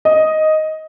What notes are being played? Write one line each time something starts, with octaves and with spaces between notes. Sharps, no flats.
D#5